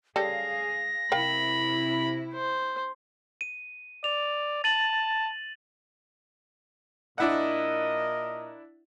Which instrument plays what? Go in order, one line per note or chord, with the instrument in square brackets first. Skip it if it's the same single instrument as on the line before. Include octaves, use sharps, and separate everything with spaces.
[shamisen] C#3 G3 A4 [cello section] G#4 F5 [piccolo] A#6
[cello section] C3 E4 [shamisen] A#4 F5 G5 [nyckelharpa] B5
[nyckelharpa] C5
[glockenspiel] D#7
[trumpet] D5 [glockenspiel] F7
[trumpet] A5 [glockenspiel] A6 D#7 F#7
[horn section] A#2 A#4 D#5 [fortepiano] D4 E4 F#5